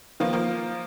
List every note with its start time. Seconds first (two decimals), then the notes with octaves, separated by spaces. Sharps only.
0.20 D#3 F3 A#3 B3 F4
0.33 F3 A#3 F5